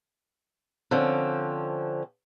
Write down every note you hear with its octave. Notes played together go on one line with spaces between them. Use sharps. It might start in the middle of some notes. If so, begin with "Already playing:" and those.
D3 F3 C4 C#4